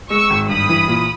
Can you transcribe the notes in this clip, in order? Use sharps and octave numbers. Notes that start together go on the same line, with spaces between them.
G#3 C#6 E6
G#1
G2 B5 D#6
E3
A#2